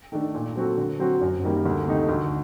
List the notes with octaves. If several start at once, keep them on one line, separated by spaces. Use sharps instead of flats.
D#3 A3 D4 A4
A#2
F#3 C4 F#4 A4
D3
F#3 C4 F#4
F#2
D#3 G3 A#3
D2
C3 D#3 A3 D#4
D2